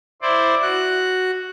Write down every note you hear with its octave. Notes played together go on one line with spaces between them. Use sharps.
E4 C5 D5
F#4 F#6